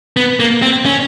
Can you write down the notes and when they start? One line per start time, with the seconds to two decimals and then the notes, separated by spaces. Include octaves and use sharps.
0.17 B3
0.40 A#3
0.62 C4
0.86 C#4